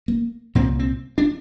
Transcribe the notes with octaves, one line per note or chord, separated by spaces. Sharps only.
A#3
C2 A#2 C4
C4
D4